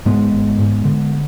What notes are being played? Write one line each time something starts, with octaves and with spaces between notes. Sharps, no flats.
G#2 G#3 B3
G#1
G#2
D3